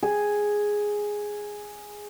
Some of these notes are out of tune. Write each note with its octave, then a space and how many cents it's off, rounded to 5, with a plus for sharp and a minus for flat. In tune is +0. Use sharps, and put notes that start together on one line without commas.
G#4 +0